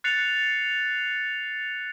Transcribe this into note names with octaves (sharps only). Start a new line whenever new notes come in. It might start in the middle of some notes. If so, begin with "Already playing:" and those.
F#6 A6 C7 C#7 F7